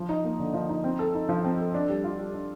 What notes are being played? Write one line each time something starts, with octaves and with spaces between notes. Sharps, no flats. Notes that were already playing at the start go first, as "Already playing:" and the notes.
Already playing: F3
D#4
A#3
D3
F3
D#4
C4
A4
D#4
F3
C4
A4
D4
G3
F4
G3
D4